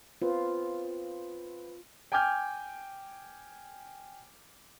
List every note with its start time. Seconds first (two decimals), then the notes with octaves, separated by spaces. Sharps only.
0.22 B3 C4 F4
2.12 G5 G#5 D6 F6 G6